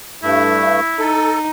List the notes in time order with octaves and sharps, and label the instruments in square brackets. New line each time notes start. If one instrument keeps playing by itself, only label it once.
[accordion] G2 A3 [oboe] E4
[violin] D#4 [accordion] A4